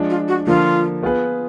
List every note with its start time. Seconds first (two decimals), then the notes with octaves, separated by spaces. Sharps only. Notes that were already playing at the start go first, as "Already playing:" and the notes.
Already playing: F3 G#3 D4
0.10 F4
0.28 F#4
0.47 D3 F3 A#3 F4
1.03 B3 F4 G#4 B4